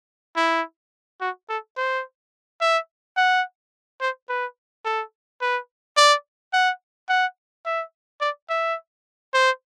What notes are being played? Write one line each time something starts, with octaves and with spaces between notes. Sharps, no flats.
E4
F#4
A4
C5
E5
F#5
C5
B4
A4
B4
D5
F#5
F#5
E5
D5
E5
C5